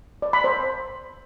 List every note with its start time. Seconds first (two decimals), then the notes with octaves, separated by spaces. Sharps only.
0.22 D5
0.33 B5
0.44 C5